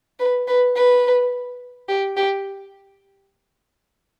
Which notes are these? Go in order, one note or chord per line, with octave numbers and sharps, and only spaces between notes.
B4
B4
B4
G4
G4